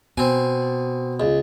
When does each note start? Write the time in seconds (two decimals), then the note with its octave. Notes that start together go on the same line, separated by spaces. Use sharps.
0.17 B2 C4 G#5
1.20 C#2